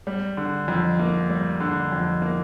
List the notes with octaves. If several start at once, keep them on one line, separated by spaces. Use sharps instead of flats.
G3
D3
F2
A#3
G3
D3
F2
A#3